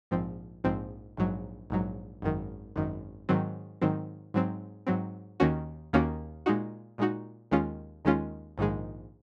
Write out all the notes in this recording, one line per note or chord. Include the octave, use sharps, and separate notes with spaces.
A#1 G#2 F3 C4
A#1 G#2 F3 C4
A#1 G#2 F#3
A#1 G#2 F#3
G#1 F#2 D#3
G#1 F#2 D#3
G#2 D#3 F#3 C4
G#2 D#3 F#3 C4
G#2 F#3 C4
G#2 F#3 C4
D#2 D#3 A#3 C#4 F#4
D#2 D#3 A#3 C#4 F#4
A#2 G#3 D#4 F#4
A#2 G#3 D#4 F#4
D#2 D#3 G#3 C#4 F4
D#2 D#3 G#3 C#4 F4
A#1 G#2 D#3 G#3